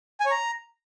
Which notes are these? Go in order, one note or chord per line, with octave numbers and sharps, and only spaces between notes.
G#5
C#5
A#5